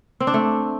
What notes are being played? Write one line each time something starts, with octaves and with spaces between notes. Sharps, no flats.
C4
D4
A3